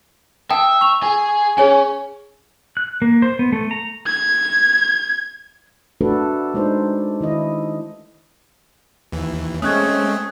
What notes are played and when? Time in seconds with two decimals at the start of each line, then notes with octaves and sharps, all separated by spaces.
0.51 E5 G5 A5 D#6
0.81 C#6 F7
1.03 G#4 G#5
1.58 C#4 G#4 C#5 G#5
2.77 F#6
3.02 A#3
3.22 C5
3.39 B3
3.52 A3
3.71 A#5
4.06 G#6
6.01 A3 D4 F#4 A4 B4
6.54 G#3 D4 D#4 C5
7.21 D#3 E4 D#5
9.12 D#2 E3
9.62 G#3 A3 C4 C#4 D#6 F#6 G#6